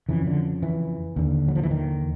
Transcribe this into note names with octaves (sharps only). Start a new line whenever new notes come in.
F2 C#3 E3
D3
E3
D#2 D3
F#3
F3
E3
D#3